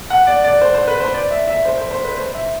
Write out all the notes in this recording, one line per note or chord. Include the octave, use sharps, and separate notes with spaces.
F#5
D5
D5
C5
C5
B4
C5
D5
E5
E5
C5
C5
C5
B4
C5
E5